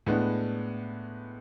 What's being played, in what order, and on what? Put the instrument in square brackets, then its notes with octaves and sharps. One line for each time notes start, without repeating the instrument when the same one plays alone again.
[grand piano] A2 G#3 B3 D4